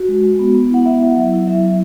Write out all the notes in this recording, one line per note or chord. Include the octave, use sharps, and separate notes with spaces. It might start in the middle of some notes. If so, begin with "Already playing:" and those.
Already playing: F#4
G#3
G#3
B3
B3
E4 F#5
B3 E5
E4
F#3
E4
F#3 E5
E4